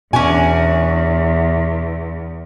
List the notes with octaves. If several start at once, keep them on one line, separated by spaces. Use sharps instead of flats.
E2 B2 C#4 D4 G#5